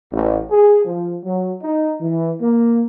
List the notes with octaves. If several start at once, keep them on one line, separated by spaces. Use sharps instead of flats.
A1
G#4
F3
F#3
D#4
E3
A#3